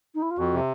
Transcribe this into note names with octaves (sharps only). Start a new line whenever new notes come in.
D#4
E4
F4
F2 F#4
C3